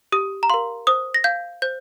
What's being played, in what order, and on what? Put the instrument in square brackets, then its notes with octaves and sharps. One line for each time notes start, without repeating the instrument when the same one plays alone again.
[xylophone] G4 D#6
A#5
A#4 F5 C6
C5 D#6
A#6
F5 G6
C5 G6